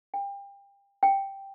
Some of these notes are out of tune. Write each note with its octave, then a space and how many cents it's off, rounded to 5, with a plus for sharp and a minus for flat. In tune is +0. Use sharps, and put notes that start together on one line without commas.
G5 +30
G5 +0